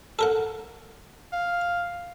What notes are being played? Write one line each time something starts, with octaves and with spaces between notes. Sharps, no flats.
A4 A#4 F#5
F5